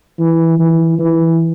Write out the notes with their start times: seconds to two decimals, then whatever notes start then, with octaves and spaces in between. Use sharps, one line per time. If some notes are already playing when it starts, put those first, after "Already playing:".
0.19 E3
0.59 E3
0.99 E3